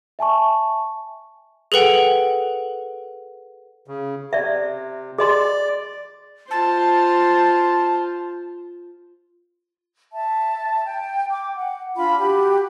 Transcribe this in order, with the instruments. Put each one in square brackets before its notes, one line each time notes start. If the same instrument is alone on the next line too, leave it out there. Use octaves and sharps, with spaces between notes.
[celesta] E5 G#5 A5 C#6
[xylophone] G#4 A4 B4 F#5 G5
[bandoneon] C#3
[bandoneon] C3 [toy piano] D5 E5
[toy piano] G#4 D#5 C6 [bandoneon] D5
[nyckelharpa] F4 C5 [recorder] A5
[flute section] E5 A5
G5
G5 D6
F#5
D4 F4 B5
F#4 G4 B5